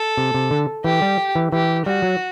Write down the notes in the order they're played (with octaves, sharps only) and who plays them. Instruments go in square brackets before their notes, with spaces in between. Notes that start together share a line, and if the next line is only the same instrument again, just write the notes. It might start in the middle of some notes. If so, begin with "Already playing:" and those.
Already playing: [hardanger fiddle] A4
[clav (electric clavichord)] C3
C3
D3
[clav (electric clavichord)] E3 [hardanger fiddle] G4
[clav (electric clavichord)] G3
E3
[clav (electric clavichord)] E3 [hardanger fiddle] G4
[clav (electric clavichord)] G3 [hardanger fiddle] F#4
[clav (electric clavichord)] F#3